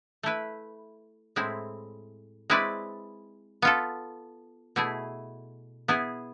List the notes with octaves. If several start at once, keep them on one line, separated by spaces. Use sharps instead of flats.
A3 E4 B4
A2 G#3 C4 E4
G#3 C4 E4 B4 D5
B3 F4 A4
B2 A3 E4 G#4
B3 E4 G#4